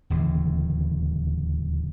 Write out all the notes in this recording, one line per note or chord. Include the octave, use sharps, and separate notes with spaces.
D1 D#2 C#3 E3